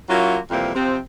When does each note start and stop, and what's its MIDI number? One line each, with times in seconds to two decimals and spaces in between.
0.09 0.36 54
0.09 0.36 58
0.09 0.36 61
0.09 0.36 64
0.09 0.36 65
0.51 0.70 41
0.51 0.70 48
0.51 0.70 52
0.51 0.70 55
0.51 0.70 58
0.75 0.97 48
0.75 0.97 53
0.75 0.97 60